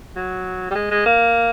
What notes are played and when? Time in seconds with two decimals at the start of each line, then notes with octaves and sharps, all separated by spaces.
0.16 F#3
0.71 G3
0.75 G#3
0.91 G#3
1.06 A#3